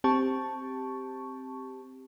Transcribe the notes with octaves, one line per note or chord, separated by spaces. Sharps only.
C4 G4 A5 C#6